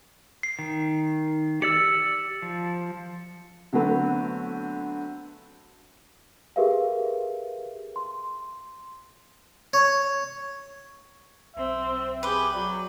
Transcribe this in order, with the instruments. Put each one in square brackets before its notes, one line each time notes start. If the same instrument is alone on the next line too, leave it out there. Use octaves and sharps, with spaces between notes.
[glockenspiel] C7
[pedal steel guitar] D#3
[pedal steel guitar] G4 D5 E6 [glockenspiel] C#7
[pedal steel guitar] F3
[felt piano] D3 F#3 A3 B3 C4
[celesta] G4 G#4 A#4 B4 E5 F5
C6
[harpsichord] C#5
[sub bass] B1 [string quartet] C4 [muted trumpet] E5
[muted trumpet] G4 [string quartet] G#4 B5 G6 [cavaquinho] B4 D6
[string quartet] F#3 [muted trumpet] D5